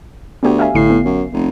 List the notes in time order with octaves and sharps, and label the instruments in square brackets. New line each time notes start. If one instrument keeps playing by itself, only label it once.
[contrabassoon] D2 [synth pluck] B3 G4
[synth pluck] E5 F5 G#5
[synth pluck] A1 D3 C7 [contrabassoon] A2
[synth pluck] B3
[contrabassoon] F#2
F1